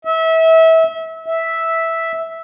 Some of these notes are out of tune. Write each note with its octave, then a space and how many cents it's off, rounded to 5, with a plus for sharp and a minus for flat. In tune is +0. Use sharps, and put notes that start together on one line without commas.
E5 -25
E5 -5